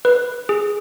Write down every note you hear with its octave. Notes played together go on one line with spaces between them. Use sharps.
B4
G#4